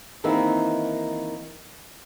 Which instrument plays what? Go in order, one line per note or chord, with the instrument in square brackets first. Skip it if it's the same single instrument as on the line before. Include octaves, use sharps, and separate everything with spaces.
[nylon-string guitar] D#3 E3 A#3 C4 D#4 E4